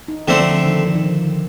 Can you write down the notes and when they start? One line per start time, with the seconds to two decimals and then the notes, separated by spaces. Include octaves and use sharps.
0.08 D#4
0.28 D3 F3 A3 C4
0.40 F3
0.66 D#3
0.86 F3
0.95 D#3
1.03 D3